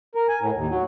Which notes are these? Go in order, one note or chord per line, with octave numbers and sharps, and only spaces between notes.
A#4
G#5
A2
D#2
F#3